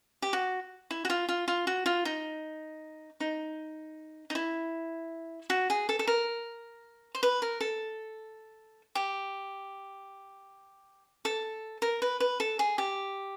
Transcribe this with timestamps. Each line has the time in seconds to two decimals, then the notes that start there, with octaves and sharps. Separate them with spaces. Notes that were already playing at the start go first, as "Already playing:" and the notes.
0.22 G4
0.33 F#4
0.91 E4
1.05 F#4
1.10 F4
1.29 F4
1.48 F4
1.67 F#4
1.86 F4
2.05 D#4
3.20 D#4
4.30 D#4
4.35 E4
5.50 F#4
5.70 G#4
5.89 A4
5.99 A4
6.07 A#4
7.15 C5
7.23 B4
7.42 A#4
7.61 A4
8.95 G4
11.25 A4
11.82 A#4
12.02 B4
12.20 B4
12.40 A4
12.59 G#4
12.78 G4